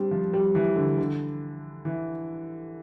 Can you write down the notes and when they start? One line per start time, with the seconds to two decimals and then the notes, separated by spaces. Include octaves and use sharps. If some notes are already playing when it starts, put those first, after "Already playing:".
Already playing: G3 C4 D4
0.11 F3
0.33 G3
0.55 E3
0.76 D3
0.98 D3
1.85 E3